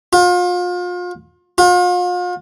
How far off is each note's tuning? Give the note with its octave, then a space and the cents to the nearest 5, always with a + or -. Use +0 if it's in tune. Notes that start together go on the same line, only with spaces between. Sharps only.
F4 +35
F4 +40